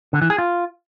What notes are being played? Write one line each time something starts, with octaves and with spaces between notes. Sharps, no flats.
D3
E3
G#4
F4